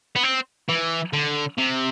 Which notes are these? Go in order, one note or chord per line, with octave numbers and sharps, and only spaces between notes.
B3
C4
E3
D3
C3